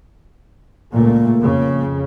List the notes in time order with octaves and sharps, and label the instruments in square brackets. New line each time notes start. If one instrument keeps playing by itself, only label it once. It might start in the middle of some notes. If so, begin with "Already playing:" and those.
[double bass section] C#2 A#2 A3 [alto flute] A#3
[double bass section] F2 C#3